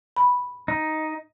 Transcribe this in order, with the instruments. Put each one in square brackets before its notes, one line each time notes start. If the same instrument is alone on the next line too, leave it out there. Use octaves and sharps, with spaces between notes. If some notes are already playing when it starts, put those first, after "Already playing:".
[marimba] B5
[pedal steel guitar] D#4